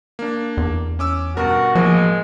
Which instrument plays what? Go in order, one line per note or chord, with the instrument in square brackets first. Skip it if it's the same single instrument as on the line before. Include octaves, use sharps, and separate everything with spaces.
[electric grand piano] A#3 D4
[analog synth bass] E2
[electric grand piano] C#4 D6 E6
[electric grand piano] G2 B2 A#4 [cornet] F#4
[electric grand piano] A1 A#3 [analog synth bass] F3 [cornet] G#3